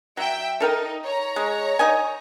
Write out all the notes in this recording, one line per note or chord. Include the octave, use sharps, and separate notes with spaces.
F#3 E5 G5
D#4 A4 A#4 G5
C#5 A#5
G#3
D#4 D#5 G#5